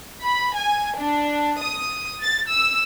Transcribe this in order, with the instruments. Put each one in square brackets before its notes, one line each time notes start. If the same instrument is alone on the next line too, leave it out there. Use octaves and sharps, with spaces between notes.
[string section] B5
G#5
D4
D#6
A6
E6